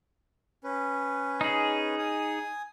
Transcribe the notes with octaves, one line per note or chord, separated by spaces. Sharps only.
C#4 B4
D#4 G#4
G#5 D#6